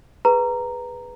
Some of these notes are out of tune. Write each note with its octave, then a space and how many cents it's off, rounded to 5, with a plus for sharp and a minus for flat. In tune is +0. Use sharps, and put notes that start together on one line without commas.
G#4 +0 B4 +0 A#5 -5